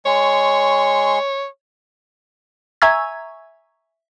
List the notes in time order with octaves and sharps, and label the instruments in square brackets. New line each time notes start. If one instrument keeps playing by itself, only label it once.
[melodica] G#3 C6 C#6 [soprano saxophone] C#5
[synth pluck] E5 G#5 A#5 C#6 E6 G#6